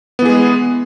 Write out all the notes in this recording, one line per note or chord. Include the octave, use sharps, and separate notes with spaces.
E3 G#3 B3 G#4